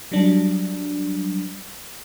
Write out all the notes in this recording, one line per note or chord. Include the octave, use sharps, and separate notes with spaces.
F#3 G3 D4